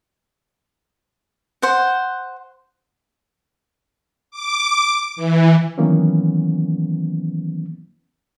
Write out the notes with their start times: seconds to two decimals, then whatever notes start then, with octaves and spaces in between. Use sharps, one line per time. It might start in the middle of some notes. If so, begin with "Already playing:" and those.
1.62 C5 F#5
4.31 D6
5.16 E3
5.78 D#3 E3 F#3 A#3 B3 C#4